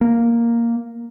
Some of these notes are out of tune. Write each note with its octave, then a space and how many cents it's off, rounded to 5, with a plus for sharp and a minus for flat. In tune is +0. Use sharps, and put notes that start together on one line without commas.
A#3 +0